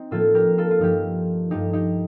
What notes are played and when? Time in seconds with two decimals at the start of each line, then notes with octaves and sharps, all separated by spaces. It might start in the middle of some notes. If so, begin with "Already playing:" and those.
Already playing: C4 D#4
0.11 A2 F3 A#3 F4 A4
0.35 G4 A#4
0.58 F4 A4
0.71 F4
0.79 G2 F3 A3 D#4 G4
1.50 G2 F3 A3 D#4 G4
1.73 D#4 G4